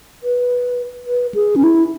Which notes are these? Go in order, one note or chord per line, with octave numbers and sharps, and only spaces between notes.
B4
B4
G#4
C#4
E4